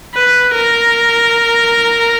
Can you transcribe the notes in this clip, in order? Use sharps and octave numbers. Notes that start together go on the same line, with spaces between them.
B4
A#4